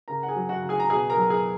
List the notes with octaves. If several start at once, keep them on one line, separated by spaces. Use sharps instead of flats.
C#3 A#4 A#5
F#5
G#4 G#5
F#3
F#4 F#5
C#3
G#4 G#5
A#5
B2 G#4 G#5
A#4 A#5
F#3
G#4 G#5